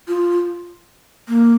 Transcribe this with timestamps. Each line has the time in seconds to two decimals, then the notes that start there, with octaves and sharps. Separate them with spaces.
0.08 F4
1.28 A#3